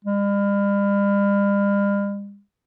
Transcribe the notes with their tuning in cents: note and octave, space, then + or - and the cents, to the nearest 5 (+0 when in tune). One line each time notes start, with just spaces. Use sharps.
G3 +45